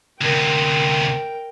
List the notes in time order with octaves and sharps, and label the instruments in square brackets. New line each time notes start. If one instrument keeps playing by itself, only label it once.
[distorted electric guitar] D2 C3 [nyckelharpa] A#4 G5